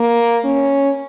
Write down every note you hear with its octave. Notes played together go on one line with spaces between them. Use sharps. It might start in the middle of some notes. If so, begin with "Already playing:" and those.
Already playing: A#3
C#4